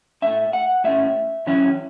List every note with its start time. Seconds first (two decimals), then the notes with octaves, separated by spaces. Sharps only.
0.22 A2 A3 C#4 E5
0.53 F#5
0.84 A2 A3 C#4 E5
1.46 F#2 E3 C#4 E4